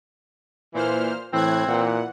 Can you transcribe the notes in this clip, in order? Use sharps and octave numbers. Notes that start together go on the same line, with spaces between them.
A#2 E3 C5 F6
A2 E3 C4 F#6 G#6
A#2 E3 F#5